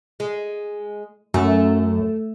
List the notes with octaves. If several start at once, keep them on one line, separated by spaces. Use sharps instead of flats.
G#3
F#2 A3